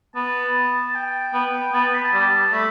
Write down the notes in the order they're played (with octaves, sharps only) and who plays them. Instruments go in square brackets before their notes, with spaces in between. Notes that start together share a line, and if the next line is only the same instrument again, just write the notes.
[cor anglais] B3 [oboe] A5
[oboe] G5
[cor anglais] B3
[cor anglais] B3 [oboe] A5
[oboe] A5
B5
A5
[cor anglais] G3
[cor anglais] A3 [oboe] B5